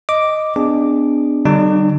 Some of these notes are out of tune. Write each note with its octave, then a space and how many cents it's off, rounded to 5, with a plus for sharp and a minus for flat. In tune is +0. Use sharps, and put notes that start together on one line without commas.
D#5 +0 D6 +0
B3 +40 D4 +5 G#4 -20
D3 +0 G3 -30 D#4 -45